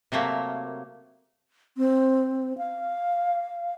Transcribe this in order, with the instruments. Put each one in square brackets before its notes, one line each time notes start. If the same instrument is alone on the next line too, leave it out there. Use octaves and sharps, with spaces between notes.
[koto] C3 F#3 A3 A#3
[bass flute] C4
F5